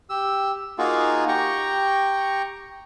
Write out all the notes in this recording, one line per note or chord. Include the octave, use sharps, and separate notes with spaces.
G4 E6
A#3 D#4 F4 F#4 G#4
G4 G5 A#5 C#6